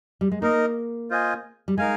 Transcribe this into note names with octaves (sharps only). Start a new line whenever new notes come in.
G3
G#3
A#3 D#4 A#4 D#5
F4 C5 D#5 G#5
G3
G#3 D#4 A#4 F5 G#5